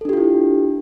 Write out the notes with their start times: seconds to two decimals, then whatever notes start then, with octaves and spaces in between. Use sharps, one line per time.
0.01 A4
0.05 D4
0.09 G4
0.13 F4
0.17 E4